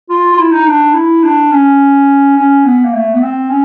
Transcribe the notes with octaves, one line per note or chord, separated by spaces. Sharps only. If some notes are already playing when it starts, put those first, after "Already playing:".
F4
F4
E4
D#4
D4
E4
D4
C#4
C#4
B3
A#3
A3
B3
C4
C#4